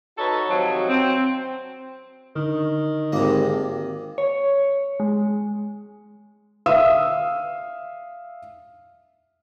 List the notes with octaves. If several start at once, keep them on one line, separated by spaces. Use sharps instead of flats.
D#4 F#4 A4 B4 C#5
C3 D#3 F3 F#3
C4
D3 D#3
G#1 C3 A#3
C#5
G#3
E5 F5 D#6 E6